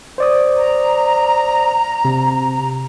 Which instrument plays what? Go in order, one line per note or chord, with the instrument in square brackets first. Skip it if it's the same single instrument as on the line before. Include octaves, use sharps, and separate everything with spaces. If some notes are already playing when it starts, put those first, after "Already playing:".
[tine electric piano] C5 D5 D#6
[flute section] A#5
[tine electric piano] C3